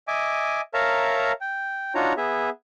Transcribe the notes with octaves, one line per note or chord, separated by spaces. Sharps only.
D#5 E5 G#5 D6
A#4 C#5 E5 F5 A5 A#5
G5
D4 D#4 F4 F#4 C#5 A#5
B3 G#4 E5